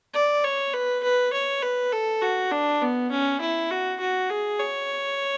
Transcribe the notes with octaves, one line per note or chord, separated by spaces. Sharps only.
D5
C#5
B4
B4
C#5
B4
A4
F#4
D4
B3
C#4
E4
F#4
F#4
G#4
C#5